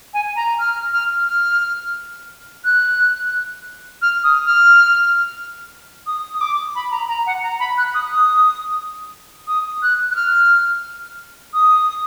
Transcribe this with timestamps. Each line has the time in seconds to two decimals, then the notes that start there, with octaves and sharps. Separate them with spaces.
0.14 G#5
0.36 A#5
0.59 F6
0.93 F6
1.28 F6
2.65 F#6
4.02 F6
4.24 D#6
4.46 F6
6.07 D#6
6.34 D#6
6.41 D6
6.75 B5
6.91 A#5
7.08 A#5
7.26 F#5
7.43 A#5
7.60 B5
7.78 F#6
7.94 D#6
8.12 D#6
9.48 D#6
9.83 F#6
10.11 F#6
10.16 F6
11.54 D#6